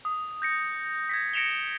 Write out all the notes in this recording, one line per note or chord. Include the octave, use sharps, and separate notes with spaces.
D#6
G6 A#6 C#7
G#6 A#6 B6
A#6 C#7 D7 E7 F7 G7